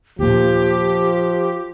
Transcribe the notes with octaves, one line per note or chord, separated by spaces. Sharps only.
D#2 A#2 F3 G4